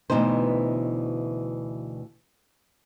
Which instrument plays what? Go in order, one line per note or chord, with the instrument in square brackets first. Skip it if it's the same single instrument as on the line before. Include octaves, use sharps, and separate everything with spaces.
[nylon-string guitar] D2 G2 B2 E3 D#4 C5